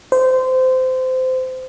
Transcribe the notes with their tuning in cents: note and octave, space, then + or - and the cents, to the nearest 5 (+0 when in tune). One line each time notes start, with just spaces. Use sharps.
C5 -20